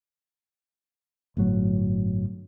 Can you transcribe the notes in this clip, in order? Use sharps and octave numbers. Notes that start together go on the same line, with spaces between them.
G1 A2 F#3